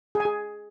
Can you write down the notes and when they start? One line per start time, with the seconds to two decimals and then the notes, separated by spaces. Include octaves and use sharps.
0.15 G#4
0.20 G#5
0.25 G#4